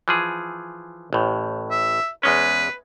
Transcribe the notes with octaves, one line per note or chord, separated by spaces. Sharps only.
E3 F3 G#4
A1 A2
E5
E2 G#3 C#4 B4